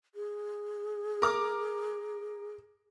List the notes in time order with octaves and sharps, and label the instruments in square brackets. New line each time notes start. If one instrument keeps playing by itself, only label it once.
[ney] G#4
[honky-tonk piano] A#4 D6 F6